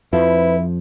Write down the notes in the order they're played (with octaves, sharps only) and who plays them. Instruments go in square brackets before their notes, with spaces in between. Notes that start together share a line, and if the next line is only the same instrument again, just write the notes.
[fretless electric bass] F2 F3 [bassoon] E4 [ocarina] B4